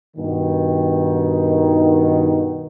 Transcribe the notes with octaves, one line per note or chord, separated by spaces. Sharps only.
G2 B2 D#3